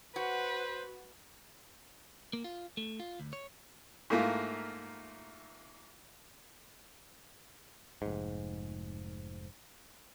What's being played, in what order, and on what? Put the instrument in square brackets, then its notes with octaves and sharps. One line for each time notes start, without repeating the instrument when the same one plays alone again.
[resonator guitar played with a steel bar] F#4 [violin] B4 [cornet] C5
[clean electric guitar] A#3
F4
A3
F4
D2
C#5
[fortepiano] G#2 A3 A#3 E4 F4
[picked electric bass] F1 G#2